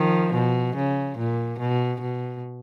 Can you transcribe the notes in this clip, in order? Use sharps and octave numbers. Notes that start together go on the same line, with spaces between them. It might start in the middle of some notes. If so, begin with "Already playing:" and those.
Already playing: D#3 F3
B2
C#3
A#2
B2
B2